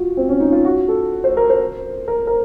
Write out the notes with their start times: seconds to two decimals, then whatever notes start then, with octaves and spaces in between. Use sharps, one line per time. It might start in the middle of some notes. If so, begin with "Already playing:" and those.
Already playing: F4 F#4
0.17 C4
0.29 C#4
0.40 D#4
0.52 F4
0.65 F#4
0.88 A4
1.24 C5
1.37 A#4
1.50 C5
2.08 A#4
2.27 A#4